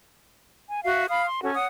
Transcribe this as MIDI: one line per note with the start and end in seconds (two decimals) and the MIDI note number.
0.69 0.83 80
0.85 1.04 66
0.85 1.04 76
0.85 1.04 77
1.09 1.25 77
1.09 1.25 83
1.09 1.25 87
1.09 1.25 89
1.26 1.40 84
1.42 1.54 61
1.42 1.54 66
1.42 1.54 69
1.54 1.66 73
1.54 1.66 78
1.54 1.66 87